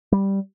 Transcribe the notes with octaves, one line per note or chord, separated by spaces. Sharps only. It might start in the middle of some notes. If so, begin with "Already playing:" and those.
G3